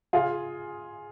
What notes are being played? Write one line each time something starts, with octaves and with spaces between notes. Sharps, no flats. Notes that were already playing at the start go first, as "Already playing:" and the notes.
F4 G#4